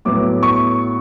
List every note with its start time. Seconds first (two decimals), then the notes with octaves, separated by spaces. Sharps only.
0.05 A2 F#3 B3 D6
0.43 C#6